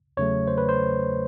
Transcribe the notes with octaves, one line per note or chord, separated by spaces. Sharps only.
E2 C#3 F#3 A3 C#5
C5
B4
C5